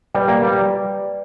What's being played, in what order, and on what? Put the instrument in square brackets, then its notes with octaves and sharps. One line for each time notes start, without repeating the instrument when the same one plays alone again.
[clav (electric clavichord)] G3 [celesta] B4 D5 G5
[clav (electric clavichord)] A#3
G3